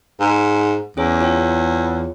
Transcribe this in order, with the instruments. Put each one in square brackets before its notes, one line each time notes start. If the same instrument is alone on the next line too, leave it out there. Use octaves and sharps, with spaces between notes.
[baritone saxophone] G#2
[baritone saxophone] E2 [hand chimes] C#4 G#4 C#5
[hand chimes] F4 C#5 G5